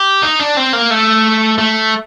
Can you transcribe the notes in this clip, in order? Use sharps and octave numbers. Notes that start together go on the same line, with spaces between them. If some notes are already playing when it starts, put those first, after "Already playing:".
Already playing: G4
D#4
D4
C4
A#3
A3
A3